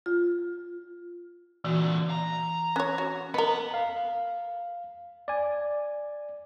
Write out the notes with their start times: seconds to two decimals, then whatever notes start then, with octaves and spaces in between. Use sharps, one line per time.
0.06 F4
1.64 A#2 D3 E3 F#4
2.10 A#5
2.76 C#4 C#5 F#6
2.98 F#4
3.34 B3 A#4 B4 D#5
3.74 F5
5.28 D5 G#5